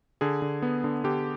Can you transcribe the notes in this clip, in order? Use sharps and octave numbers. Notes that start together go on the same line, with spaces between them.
D3 G#4
D3
B3
D3
D3 G4